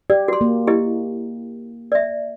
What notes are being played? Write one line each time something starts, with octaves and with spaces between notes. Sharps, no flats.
G4 D5
F#4 C6
A#3
E4 G4 D#5
D5 E5